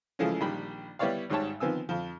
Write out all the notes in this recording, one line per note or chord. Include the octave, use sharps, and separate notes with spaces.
C#3 E3 F3 G#3 A3 C#4
A#1 D#3 G3 B5
G3 B3 E4 C#5 D5 F5
G#1 G#2 G3 C#5 A5
D#3 F3 B3 C4 G#5 E6
F2 F3